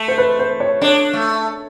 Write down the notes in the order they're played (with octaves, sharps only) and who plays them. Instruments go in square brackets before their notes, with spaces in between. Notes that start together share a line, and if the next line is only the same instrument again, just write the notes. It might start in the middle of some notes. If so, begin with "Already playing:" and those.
Already playing: [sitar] A3
[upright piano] C5
B4
C5
C#5
[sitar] D4 [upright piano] C#5
[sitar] A3